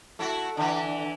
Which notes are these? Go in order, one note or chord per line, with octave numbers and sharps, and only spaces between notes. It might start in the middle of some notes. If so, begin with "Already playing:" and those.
A3 E4 F#4
D3 E3